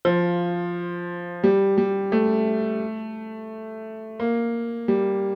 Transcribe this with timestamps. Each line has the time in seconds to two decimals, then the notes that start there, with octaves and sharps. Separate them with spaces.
0.05 F3
1.44 G3
1.78 G3
2.12 A3
4.20 A#3
4.88 G3